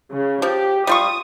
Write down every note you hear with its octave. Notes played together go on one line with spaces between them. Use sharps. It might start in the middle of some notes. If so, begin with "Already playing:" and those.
C#3
F3 G4
G3 F4 C#6 D#6